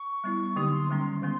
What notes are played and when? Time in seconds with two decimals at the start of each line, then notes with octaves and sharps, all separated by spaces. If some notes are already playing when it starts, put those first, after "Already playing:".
Already playing: C#6
0.24 G3 B3 E4
0.56 D3 F#3 A#3 D#4 G4 D#6
0.73 C6
0.89 D#3 G3 A#3 C#4 C6
1.22 D#3 G#3 B3